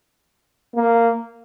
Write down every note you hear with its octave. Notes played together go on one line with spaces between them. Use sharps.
A#3